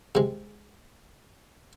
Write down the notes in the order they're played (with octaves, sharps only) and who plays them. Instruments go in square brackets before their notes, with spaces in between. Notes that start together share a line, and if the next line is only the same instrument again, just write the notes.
[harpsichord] C3 G#3